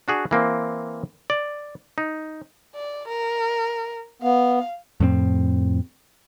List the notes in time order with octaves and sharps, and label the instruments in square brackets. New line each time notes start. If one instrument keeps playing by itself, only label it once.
[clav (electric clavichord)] D4 F#4 G#4
E3 A#3 C4
D5
D#4
[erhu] D5
A#4
[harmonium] B3 [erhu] F5
[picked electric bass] F2 A2 B3 C4